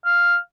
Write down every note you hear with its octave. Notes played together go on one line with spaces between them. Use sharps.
F5